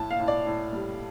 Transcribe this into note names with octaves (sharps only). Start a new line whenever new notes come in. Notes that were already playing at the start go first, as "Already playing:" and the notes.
Already playing: A2 A5
F5
A2
D5
A2
G3